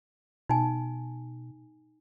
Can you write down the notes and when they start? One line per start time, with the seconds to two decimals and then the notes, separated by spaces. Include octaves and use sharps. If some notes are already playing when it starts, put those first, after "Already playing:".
0.49 B2 D#4 G#5